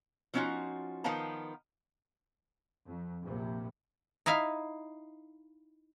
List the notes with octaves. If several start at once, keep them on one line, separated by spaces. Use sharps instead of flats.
F3 C4 C#4 D#4 F4 F#4
D#3 F3 B3 F5 A5 A#5
F2
A#1 C3
D#4 E4 E5 F5